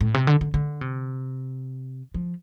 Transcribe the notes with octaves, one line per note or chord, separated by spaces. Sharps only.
A2
C3
D3
D3
D3
C3
F3